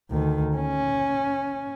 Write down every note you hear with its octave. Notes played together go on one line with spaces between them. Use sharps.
D2 D#3
C#4